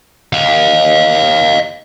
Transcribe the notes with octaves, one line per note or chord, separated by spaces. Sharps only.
D#5 F5